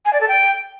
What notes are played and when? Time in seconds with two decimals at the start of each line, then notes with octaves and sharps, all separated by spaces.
0.05 G#5
0.12 D5
0.20 A4
0.28 G5